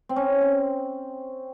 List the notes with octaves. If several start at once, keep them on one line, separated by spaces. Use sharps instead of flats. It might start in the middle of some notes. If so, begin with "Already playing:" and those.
C4
C#4
C4